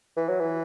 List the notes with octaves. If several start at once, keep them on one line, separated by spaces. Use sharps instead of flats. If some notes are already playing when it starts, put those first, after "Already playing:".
E3
F#3
E3